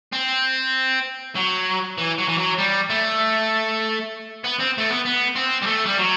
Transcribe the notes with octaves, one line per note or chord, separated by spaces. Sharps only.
C4
F#3
E3
F#3
E3
F#3
G3
A3
B3
C4
A3
B3
B3
C4
G3
A3
G3
F#3